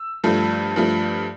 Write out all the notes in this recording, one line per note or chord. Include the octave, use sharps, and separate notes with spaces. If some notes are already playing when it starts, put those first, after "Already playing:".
Already playing: E6
G2 F3 A3
G2 F3 A3